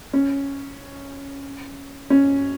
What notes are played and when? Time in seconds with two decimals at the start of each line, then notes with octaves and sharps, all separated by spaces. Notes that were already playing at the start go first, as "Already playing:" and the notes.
0.13 C#4
2.10 C#4